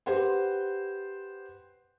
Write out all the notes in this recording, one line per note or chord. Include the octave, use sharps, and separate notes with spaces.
G4 B4 C5 F#5 C6